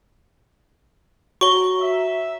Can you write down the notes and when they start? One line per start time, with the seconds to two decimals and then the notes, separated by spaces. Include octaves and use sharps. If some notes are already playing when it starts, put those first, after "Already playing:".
1.41 F#4 C#5 A#5 C#6 G7
1.81 E5